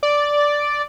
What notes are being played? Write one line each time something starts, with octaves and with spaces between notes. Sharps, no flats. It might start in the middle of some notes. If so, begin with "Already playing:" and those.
D5